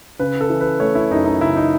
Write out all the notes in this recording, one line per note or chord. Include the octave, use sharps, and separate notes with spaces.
C#3 B4
A4
E3
B4
A3 C#5
E4
F#2 D#4
D#4
C#3 E4
D#4